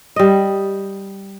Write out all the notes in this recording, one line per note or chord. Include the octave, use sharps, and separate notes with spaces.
G3 D#5